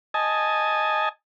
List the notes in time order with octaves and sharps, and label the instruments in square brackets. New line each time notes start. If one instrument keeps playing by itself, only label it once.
[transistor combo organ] D#5 G#5 A5